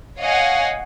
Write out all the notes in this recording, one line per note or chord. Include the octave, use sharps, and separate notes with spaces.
C#5 D#5 F5 F#5 G#5